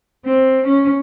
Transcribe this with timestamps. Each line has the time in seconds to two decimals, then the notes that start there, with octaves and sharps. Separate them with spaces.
0.25 C4
0.66 C#4